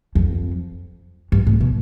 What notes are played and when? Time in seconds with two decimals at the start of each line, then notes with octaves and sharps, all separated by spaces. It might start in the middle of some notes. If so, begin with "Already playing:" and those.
0.15 F2
1.32 G2
1.47 A2
1.60 B2